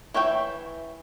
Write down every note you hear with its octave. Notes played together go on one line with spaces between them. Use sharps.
E3 C#5 E5 G5